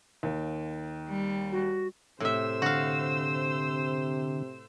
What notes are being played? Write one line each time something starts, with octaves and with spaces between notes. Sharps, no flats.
D#2
G3
F#4
A2 C3 C5 E5 E6
D3 F#4 F5